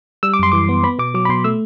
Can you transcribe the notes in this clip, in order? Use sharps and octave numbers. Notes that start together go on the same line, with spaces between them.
G3 E6
D6
F#2 C6
E3 D6
B3
B3 B5
B2 D6
F#3 D6
B5
B2 C6
A3 E6